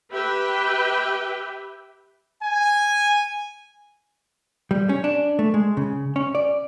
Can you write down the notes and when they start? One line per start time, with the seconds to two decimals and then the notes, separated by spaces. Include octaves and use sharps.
0.11 G4 B4 E5 G5
2.44 G#5
4.71 G3
4.89 C#4
5.04 D4
5.39 A3
5.54 G#3
5.77 C#3
6.16 C#4
6.35 D5